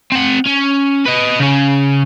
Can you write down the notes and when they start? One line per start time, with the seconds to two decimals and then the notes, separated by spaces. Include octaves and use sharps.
0.12 C4 F#5
0.47 C#4
1.06 B4 D#5
1.40 C#3 C#4